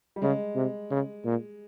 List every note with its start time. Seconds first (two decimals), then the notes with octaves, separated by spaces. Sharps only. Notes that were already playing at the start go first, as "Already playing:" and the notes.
0.16 G3
0.22 C#3 G#3
0.56 C3
0.91 C#3
1.25 A#2